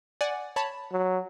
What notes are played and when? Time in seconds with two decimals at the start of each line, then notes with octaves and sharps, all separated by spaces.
0.21 D5 F#5 G#5
0.56 C#5 A5 B5
0.92 F#3